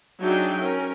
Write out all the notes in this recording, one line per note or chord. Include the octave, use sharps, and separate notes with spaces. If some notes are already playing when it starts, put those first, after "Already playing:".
F#3 D4 D#4 G#4 E5 G5
C#4 A#4